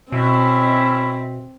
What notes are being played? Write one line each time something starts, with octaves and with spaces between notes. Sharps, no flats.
B2 C4 C#4 E4 E5